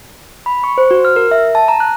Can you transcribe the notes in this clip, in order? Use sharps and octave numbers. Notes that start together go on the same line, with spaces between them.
B5
C#6
C5
F#4
F6
A#4
E5
A5
A#5
F#6